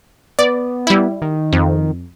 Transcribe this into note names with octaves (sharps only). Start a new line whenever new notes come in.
B3 D5
G3 E4
D#3
F2